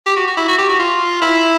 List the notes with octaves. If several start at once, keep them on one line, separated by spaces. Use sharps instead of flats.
G4
F#4
F#4
E4
F#4
G4
F#4
F4
E4